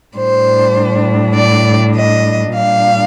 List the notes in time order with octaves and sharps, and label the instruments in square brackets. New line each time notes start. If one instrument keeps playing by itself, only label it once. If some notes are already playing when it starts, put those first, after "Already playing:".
[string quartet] A2 G3 D4 C5
D5
D#5
A#2 G3 D4 F5